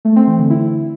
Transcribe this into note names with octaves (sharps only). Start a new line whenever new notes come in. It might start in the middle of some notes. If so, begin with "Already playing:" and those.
A3
C4
E3
D3
E4